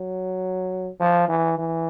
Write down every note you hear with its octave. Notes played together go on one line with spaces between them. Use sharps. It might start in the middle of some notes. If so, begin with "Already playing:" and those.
Already playing: F#3
F3
E3
E3